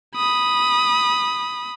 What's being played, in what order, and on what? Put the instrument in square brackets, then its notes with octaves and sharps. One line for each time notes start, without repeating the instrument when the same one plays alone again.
[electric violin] B5 D#6